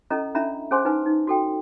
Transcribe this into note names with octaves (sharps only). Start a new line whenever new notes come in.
C#4 E4 A4 D#5 A#5
C#4 D4 E4 E5 A#5 B5
C#4 G#4 C5 G#5 C6
D#4 E4 B4 G#5
D#4
F#4 A4 G5